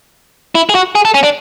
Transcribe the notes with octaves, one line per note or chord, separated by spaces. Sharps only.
E4
G#4
F#4
G#4
A4
C#4
D4